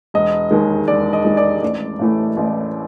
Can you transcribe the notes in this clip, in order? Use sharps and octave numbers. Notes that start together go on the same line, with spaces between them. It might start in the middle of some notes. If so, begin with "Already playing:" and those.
E1 D#5
D#2 D#3 G#3
E1 D5
D#5
D#2 D#3 G#3
D5
A1 D5
A2 E3 A3
A1